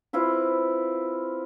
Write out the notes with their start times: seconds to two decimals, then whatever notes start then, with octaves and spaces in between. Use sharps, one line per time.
0.13 C4 E4 F4 B4